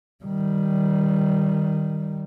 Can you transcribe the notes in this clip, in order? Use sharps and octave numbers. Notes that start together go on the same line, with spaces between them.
D#3 G3